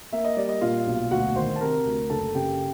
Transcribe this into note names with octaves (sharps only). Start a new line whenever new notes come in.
A#3 E5
D#5
G3 D5
D#5
A#2 F4 F5
B1
D2 F#4 F#5
D#3 C5 C6
A5
C3 A#4 A#5
D2
F#1 A4 A5
C#3 G4 G5